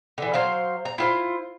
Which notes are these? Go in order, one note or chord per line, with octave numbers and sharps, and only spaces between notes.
D3 E3
F#3 C5 F5
A#5
E4 F4 C5